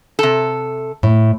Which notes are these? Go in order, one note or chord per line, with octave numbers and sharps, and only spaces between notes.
C3 A4
A2